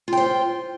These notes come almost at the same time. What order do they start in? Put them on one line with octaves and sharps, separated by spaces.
F4 G5 C5